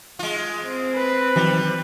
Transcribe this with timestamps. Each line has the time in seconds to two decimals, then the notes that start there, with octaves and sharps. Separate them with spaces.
0.19 G#3 F4
0.65 C4
0.95 B4
1.36 D#3 E3 F#3 G3